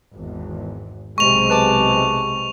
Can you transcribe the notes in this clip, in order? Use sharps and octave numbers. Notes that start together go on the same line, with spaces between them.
G#1 E2
B1 C3 G#3 C#6 F7
B4 A5 D6